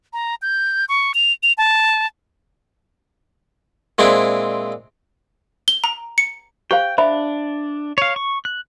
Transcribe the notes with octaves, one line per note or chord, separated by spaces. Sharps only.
A#5
G6
C#6
F7
F7
A5
A#2 G#3 C4 D4 E4
G7
A#5
C#7
G4 C5 F5 G5
D4 C5 E5 B5
C#5 F5
C#6
F#6